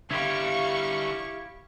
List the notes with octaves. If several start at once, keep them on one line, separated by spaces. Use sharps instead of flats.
D3 G3 E4 G4 F5 C#6